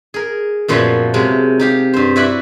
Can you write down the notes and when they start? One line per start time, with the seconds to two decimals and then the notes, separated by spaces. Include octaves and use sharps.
0.14 G#4 A#4
0.68 F#2 A#2 F3 B3 C#5 E5
1.14 C3 F#3 G#3
1.60 D#4 G4 F5
1.93 G2 C5
2.16 E4 F#4 B4 D5 E5 F#5